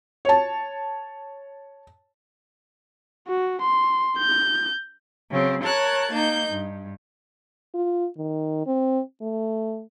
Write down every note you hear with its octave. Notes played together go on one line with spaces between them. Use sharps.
C#5 A5
F#4
C6
G6
C#3 F#3 C4
A#4 C#5 A5 F#6 G#6
A#3 D#4 G6
G2
F4
D#3
C4
A3